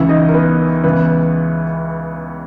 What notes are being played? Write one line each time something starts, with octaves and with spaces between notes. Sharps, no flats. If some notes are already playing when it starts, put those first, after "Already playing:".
Already playing: C#2 C#3 E3 E4 E5
D#4 D#5
A#4
B3 B4
C#2 C#3 E3 B3 B4